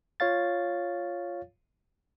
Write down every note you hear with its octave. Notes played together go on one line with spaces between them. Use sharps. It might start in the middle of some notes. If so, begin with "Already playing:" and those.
F4 C#5 F5 A6